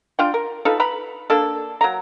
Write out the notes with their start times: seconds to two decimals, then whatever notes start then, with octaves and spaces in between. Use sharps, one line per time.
0.19 D4 F4 G5
0.34 A#4
0.65 D#4 F4 A4 B4
0.80 B4 A#5 B5
1.30 A#3 D4 A4
1.81 F#3 A#3 A#5